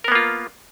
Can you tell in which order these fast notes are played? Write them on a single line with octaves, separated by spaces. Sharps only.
A#4 B3 A#3 F4